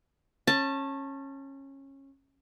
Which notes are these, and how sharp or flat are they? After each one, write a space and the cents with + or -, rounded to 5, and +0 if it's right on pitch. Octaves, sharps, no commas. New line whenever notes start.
C#4 -20 A5 +10